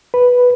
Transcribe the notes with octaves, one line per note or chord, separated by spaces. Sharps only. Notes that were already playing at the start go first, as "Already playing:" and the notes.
B4